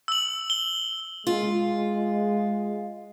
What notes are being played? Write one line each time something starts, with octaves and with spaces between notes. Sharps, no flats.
E6 F#7
G7
G#3 F4